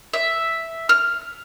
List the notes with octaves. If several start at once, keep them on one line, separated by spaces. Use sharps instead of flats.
E5
F6